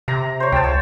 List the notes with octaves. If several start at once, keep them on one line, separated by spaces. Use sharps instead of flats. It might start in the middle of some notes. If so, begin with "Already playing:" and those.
C3 A#5
C5 C#5
C#2 G5 A5
C#5